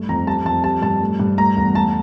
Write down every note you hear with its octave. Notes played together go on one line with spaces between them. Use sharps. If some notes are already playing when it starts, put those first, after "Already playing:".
Already playing: G2 A3
F2 A#5
G3 A5
F2 A5
G3 A5
G2 A5
A3
G2
A3 A#5
E2
A3 A5